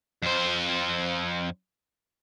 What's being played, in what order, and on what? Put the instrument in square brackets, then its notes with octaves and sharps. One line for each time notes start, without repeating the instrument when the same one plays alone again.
[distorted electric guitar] F2 C5